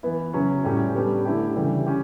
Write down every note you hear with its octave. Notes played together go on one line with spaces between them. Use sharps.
E3 B3 E4
C#3 F#3 C#4
A2 G3 C#4 G4
G3 B3 D4 G4
D3 A3 E4 G4
C#3 E3 G3
C#4 G4